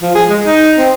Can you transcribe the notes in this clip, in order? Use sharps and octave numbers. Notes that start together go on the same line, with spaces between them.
F3
G#4
G#3
D#4
C4